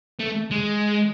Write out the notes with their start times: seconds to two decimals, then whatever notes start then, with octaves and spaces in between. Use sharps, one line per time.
0.20 A3
0.51 G#3